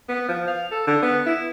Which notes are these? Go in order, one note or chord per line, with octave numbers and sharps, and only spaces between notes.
B3
F3
F5
A4
D3
B3
E4